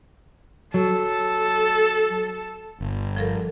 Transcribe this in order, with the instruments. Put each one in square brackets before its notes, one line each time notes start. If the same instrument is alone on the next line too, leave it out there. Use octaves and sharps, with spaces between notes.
[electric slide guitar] F#3 [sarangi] A4
[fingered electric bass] G1
[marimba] F3 A4 A#4